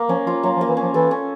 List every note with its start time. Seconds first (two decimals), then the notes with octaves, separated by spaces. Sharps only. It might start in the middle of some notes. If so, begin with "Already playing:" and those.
Already playing: A#3
0.09 F3 C#4
0.26 F3 F4
0.43 F#3 A#3
0.57 F3
0.61 A#3
0.69 E3
0.77 C#4
0.82 F3
0.94 E3 A4
1.11 C#4